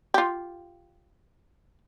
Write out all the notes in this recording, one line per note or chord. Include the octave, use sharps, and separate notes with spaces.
F4 G4